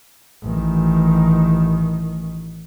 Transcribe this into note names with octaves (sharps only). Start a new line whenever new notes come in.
A1 D#3